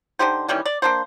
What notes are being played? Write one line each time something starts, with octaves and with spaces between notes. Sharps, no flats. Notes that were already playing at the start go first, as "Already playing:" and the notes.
D3 D#4 G4 C5
D#3 E3 G3 C#4
D5
A#3 D4 C5